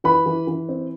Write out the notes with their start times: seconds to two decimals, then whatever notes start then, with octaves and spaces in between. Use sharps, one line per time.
0.04 E3 B4 B5
0.26 E3
0.47 E3
0.69 C4